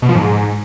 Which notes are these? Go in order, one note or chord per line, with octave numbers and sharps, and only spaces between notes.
B2
F3
G#2